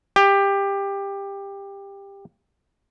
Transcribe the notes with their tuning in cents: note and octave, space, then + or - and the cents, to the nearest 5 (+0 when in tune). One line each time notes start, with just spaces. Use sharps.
G4 +15